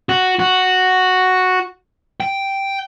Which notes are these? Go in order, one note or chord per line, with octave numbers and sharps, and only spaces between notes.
F#4
F#4
G5